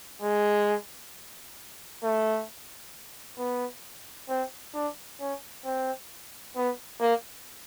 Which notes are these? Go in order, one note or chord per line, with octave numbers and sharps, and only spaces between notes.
G#3
A3
B3
C4
D4
C#4
C4
B3
A#3